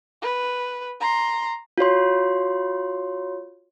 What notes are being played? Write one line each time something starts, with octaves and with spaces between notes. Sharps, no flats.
B4
A#5 C6
F4 F#4 C#5 C6